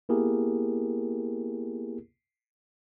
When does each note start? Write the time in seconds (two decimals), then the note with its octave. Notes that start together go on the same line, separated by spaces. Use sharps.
0.09 A#3 B3 E4 G4 G#4 A#4